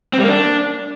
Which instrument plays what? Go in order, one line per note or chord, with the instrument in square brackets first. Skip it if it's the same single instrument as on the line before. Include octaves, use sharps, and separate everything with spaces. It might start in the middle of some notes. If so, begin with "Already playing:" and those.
[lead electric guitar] C4
G3
A#3
D4